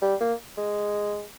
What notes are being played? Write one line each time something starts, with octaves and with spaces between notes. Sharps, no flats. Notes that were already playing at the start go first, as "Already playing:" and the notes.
G3
A#3
G#3